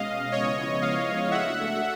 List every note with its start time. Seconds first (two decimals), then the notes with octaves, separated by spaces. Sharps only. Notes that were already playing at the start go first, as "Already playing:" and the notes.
Already playing: B2 G#3 C#4 D#5 F5
0.32 C#3 F3 G#3 B3 E4 C#5 D#5
0.82 D#5 F5
1.31 A3 D4 F#4 A4 E5 F#5